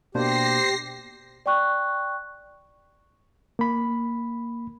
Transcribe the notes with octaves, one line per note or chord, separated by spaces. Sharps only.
B2 A#3 D4 G4 C5 A#6 C7
D5 G5 C#6 F#6
A#3 B5